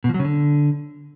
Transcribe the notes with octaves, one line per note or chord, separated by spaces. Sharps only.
B2
F3
F#3
C#3
D3